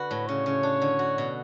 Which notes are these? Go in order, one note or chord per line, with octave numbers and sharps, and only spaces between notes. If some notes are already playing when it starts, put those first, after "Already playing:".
Already playing: D3 F#4 B4
A2
C#3 C#5
C#3
D4
D3
F#4
B2